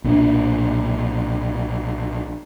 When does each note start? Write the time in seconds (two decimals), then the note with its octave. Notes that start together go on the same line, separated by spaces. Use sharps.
0.04 B1 A#2 E3 D4